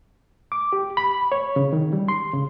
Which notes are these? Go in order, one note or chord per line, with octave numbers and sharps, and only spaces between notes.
D6
G4
B5
C#5
C#3
D#3
G3
C6
C#3